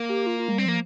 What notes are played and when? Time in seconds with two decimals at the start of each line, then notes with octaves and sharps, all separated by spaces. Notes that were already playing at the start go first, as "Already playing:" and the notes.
Already playing: A#3
0.09 G4
0.26 F4
0.39 F4
0.48 G#3
0.52 G3
0.58 C4
0.66 F3 A#3